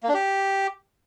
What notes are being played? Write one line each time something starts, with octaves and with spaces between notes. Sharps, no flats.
A#3
D4
G4